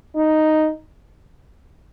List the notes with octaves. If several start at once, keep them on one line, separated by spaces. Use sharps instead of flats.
D#4